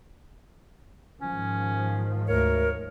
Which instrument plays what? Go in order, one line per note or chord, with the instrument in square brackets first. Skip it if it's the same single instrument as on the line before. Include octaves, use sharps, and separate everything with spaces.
[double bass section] G#2 D#3 F3 [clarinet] C#4
[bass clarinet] D2 [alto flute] A#4 [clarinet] C#5